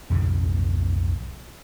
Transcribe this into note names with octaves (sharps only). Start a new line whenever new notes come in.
B1 F2 G#2 C#3